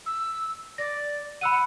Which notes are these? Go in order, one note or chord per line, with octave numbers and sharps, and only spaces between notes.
E6
D5 A#6
F#5 B5 E6 D#7